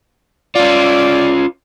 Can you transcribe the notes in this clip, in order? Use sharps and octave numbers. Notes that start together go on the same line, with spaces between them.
C#4 F4 D5